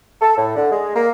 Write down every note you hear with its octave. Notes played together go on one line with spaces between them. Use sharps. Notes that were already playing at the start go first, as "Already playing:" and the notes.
A4
A2
D3
G#3
A#3